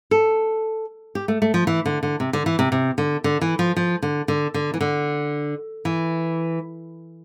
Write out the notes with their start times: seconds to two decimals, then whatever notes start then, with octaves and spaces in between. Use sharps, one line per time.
0.11 A4
1.15 G4
1.28 A3
1.42 A3
1.54 F3
1.67 E3
1.86 D3
2.03 D3
2.20 C3
2.33 D3
2.46 E3
2.59 C3
2.72 C3
2.98 D3
3.24 D3
3.41 E3
3.59 F3
3.76 F3
4.02 D3
4.28 D3
4.54 D3
4.74 E3
4.81 D3
5.85 E3